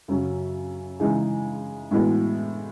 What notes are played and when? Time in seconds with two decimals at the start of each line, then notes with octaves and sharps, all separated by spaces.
0.08 F#2 C#3 F#3 C#4
1.00 C#3 E3 G#3 D#4 G#4
1.91 A2 E3 G#3 B3 F#4